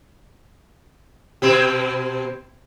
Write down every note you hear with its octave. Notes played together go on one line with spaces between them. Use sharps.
B2 C4 G4